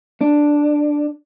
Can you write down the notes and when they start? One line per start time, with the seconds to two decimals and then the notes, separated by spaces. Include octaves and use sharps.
0.21 D4